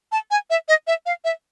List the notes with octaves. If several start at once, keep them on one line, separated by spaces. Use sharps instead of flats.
A5
G#5
E5
D#5
E5
F5
E5